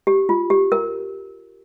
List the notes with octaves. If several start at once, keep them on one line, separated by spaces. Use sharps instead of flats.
G4
F4
G4
A#4